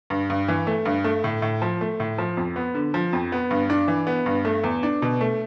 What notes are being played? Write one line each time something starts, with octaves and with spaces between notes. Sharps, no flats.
G2
G2
E3
A3
G2
A3
A2
A2
F3
A3
A2
F3
F2
B3
D3
F3
F2
B3
G2
D4
E3
B3
G2
A3
E2
D4
B2
A3